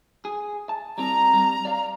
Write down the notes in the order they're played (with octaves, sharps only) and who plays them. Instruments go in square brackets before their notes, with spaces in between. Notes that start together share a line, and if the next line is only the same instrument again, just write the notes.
[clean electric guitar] G#4
A5
[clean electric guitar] G3 C4 [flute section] A#5
[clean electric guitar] G2 G3
D5 F5